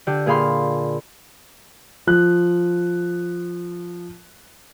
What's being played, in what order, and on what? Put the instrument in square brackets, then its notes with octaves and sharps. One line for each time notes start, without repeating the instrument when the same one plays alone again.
[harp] D3 G4 E6
A#2 G#4 F5 B5 C6
[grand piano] F3 F#6